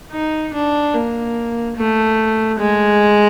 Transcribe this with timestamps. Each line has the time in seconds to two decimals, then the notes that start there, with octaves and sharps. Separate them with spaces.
0.12 D#4
0.54 D4
0.94 A#3
1.77 A3
2.60 G#3